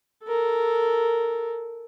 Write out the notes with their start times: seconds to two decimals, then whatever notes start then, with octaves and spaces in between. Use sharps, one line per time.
0.24 A4 A#4